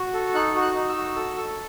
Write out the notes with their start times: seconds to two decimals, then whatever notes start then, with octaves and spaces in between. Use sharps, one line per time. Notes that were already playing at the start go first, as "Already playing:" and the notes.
Already playing: F#4
0.14 A4
0.34 D#4 F#6
0.55 F#4
0.62 F#6
0.76 D#4
0.89 E6
0.96 F#4
1.16 A4
1.37 A4